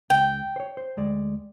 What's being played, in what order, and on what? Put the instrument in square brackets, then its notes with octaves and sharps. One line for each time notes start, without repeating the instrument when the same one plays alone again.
[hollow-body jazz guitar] C#2 [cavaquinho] G5
[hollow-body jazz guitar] C5 C#5
C5
D2 G#3 D5